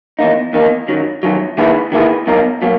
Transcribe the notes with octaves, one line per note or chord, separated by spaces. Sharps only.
E2 D#3 A#3 D#4
E2 D#3 A#3 D#4
F#2 D#3 F#3
F#2 D#3 F#3
D#3 A#3 E4 G#4 B4
D#3 A#3 E4 G#4 B4
B2 F#3 A#3 D#4 A#4
B2 F#3 A#3